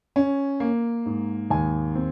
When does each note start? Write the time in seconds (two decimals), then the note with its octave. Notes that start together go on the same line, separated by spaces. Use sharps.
0.16 C#4
0.60 A#3
1.06 G#2
1.50 D#2 G#5
1.95 C4